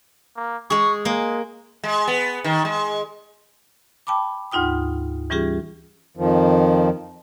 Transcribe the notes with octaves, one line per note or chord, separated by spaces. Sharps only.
A#3
G#3 G#4 C#6
G#3 A#3
G#3
B3
D#3
G#3
G5 A5 B5 D6
D2 G#2 D#4 F4 G5 D#6
E3 G3 C#4 F4 G4 G#4
F2 D#3 F3